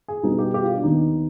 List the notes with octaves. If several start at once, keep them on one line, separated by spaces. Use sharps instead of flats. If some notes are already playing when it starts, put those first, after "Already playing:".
G#4
B2 G3 B3 D#4
G4
G4
F4
D4
D#2 D#3 B3 D#4